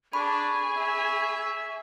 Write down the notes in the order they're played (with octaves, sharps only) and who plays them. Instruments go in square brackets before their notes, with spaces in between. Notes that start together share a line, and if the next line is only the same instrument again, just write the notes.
[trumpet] D4 [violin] G#4 [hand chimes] B5 [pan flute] C#6
[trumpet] E5